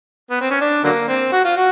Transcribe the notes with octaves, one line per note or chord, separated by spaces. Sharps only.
B3
C4
C#4
D4
D3 F#3 A#3
C4
F#4
F4
F#4